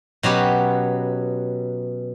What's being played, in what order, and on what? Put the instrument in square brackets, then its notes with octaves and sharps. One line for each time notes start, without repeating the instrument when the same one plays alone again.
[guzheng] B2 F#3 C#4 G4 B4